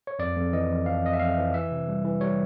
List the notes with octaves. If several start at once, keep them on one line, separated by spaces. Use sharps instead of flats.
C#5
F2 D5
F2
E3 D#5
F2
F2 F5
F2 D#5
E5
F2 F5
E3
E3 E5
C3
G3
E3
G3 C#5